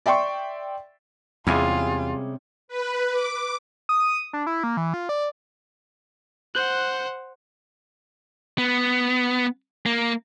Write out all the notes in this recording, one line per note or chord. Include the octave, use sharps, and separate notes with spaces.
D5 E5 G5 C6 C#6
E2 C3 G3 G#3 C#4 F4 G#4
B4
D6
D#6
D4
E4
A#3
E3
F4
D5
C5 F#5 F#6 G6
B3
A#3